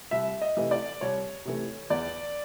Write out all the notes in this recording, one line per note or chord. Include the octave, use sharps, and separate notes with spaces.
C2 E5
D#5
C3 E3 A3
D5
C2 C#5
C3 E3 A3
E2 D5